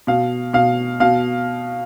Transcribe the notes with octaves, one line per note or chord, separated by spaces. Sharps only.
B2 F5
B2 F5
B2 F5